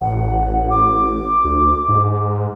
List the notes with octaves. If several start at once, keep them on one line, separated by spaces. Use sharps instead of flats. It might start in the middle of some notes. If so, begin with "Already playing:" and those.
A1 F#5
D6
D2
G#2